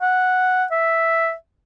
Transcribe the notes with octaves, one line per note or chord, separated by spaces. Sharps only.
F#5
E5